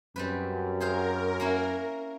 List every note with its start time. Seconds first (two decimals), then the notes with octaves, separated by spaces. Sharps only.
0.16 F#2 G3 C4 B4
0.80 G#4 A#4 C5 F5
1.40 A#3 C#4 E4